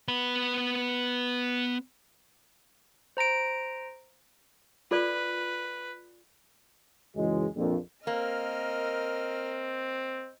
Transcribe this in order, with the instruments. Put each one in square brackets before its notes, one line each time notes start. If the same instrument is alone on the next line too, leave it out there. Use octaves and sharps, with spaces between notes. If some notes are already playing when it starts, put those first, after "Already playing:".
[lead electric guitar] B3 B5
[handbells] C5 A#5 A#6 D7
[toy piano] F4 A4 D5 [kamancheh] B4
[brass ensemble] C#2 F#2 E3 F#3 G#3
A#1 F2
[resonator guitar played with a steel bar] A#3 [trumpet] C4 [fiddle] A#4 F6 [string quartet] D#5